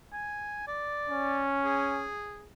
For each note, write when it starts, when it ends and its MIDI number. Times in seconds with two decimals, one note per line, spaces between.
0.13 0.67 80
0.68 1.43 74
1.09 2.10 61
1.65 2.49 68